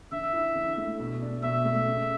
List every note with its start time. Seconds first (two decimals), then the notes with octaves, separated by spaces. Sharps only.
0.12 D3 E5
0.33 E4
0.56 D3
0.77 A3
1.00 B2
1.22 D4
1.43 B2 E5
1.65 A3
1.87 C#3